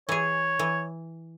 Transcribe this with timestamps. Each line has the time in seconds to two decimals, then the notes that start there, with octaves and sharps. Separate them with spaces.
0.09 E3 G#4 C#5
0.59 E3